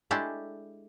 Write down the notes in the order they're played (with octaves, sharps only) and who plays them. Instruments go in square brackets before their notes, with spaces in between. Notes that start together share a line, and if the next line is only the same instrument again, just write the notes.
[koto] G#3 A3 D4 E4 G4 A4